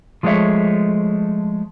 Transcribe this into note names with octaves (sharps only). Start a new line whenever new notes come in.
F3 G#3 A3 B3 C#5 E5